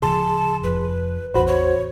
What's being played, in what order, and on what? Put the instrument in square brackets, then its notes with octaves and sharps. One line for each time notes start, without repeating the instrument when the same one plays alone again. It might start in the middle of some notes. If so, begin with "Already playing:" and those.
[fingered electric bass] D1 C#3 F3 [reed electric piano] G#4 C6 [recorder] A5
[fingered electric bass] F1 F3 [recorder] B4
[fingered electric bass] A1 E2 [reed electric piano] F#4 C5 [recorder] B5
[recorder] C#5